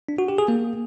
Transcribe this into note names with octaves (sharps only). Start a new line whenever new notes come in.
D4
F#4
G4
G#4
A#3